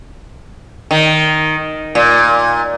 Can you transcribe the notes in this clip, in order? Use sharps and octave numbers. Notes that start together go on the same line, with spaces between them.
D#3
A#2